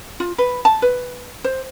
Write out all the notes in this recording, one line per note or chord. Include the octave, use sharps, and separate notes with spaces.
F4
B4
A5
B4
C5